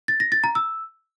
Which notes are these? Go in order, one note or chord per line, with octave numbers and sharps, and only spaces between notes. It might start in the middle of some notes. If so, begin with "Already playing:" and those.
A6
A#6
A6
A#5
E6